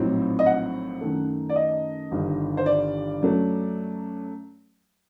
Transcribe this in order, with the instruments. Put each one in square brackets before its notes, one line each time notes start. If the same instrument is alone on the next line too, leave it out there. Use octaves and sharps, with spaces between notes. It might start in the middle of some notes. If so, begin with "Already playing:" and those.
Already playing: [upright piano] A#1 A2 F#3 C4 D#4
D#5
F#5
F#2 D#3 A3
D5
D#5
G1 G2 D#3
C5
D5
F#2 F#3 A3